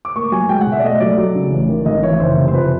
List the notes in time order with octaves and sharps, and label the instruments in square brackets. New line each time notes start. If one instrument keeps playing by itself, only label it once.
[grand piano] D6
A#3 C#6
F#3 G#5
G#3 G5
F#5
B2
E5
D5
A3 D#5
F#3 D5
F#3
C#3
A1
D#3
G#1 D#5
E3 C#5
F#1 C5
C3
C5
F2 B4